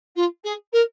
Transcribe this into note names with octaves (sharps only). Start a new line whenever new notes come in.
F4
G#4
A#4